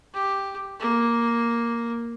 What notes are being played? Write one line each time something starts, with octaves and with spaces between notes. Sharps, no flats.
G4
A#3